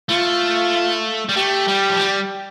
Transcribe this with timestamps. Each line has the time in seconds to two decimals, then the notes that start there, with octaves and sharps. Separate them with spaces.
0.09 A3 F4
1.29 G3
1.36 A3 G4
1.68 G3
1.90 F3
1.99 G3